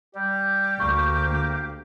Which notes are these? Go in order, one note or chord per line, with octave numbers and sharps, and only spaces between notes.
G3 G4
D2 A#3 C#6